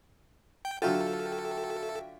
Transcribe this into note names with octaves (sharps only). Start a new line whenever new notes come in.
G5
D3 F#3 F4 F#4 A4 E5 G5